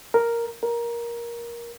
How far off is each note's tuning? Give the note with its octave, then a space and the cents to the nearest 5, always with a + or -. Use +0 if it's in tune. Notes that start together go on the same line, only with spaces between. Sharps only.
A#4 +0
A#4 +15